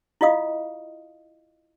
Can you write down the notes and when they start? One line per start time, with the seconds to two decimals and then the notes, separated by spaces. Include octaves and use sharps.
0.21 E4 F4 D#5 F5 D#6